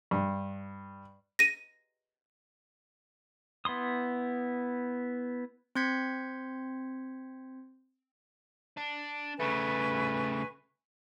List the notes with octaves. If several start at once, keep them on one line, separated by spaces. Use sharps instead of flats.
G2
A#6 D#7
B3 E4 C6 D#6
C4 C6 G6 G#6 B6 C#7
D4
C#3 A3 B4 G#5 C#6